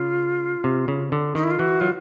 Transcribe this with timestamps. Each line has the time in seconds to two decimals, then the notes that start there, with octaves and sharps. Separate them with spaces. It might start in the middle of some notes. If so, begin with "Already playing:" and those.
Already playing: C#3 F4
0.64 C3
0.88 C#3
1.12 D3
1.35 D#3 D#4
1.44 E4
1.51 F4
1.59 E3 F#4
1.80 F#3 F4